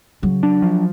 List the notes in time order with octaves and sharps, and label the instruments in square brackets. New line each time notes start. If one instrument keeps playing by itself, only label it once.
[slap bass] C#3 [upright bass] F#3
[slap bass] D4
F3